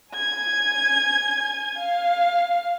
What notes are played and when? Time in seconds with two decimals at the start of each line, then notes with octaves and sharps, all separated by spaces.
0.12 G#5 G#6
1.78 F5